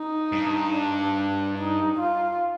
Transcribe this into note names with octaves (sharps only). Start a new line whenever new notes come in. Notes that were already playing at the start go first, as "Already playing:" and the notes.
Already playing: D#4
G2
D4
D#4
F4